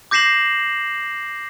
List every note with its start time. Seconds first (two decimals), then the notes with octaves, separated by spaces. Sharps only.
0.11 D6 G6 A#6 C7 E7 F#7